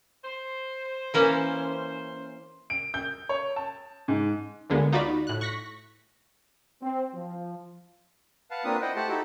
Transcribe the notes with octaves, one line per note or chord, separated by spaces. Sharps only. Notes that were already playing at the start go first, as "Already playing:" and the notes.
C5
E3 A#3 C#4
D7
G6
C#5
A5
G#2
D2 D3 G#3 A#3 B3
D#4 F4 F#4 D5 B5
A2 F#6
C#6 F#6 A#6 B6
C4
F3
B4 F5 F#5 A5
A#3 C4 D4 F4 B4 D#6
E4 C5 D#5 F#5 G5
A3 G4 C5 F#5 A5
D#4 E4 F#4 G4 A4